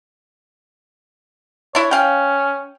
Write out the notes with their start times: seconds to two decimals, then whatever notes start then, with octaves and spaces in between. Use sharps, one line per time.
1.75 D4 E4 C#5
1.91 C#4 F5 G5